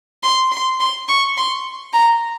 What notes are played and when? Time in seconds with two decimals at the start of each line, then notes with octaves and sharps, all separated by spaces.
0.23 C6
0.52 C6
0.80 C6
1.08 C#6
1.38 C6
1.94 A#5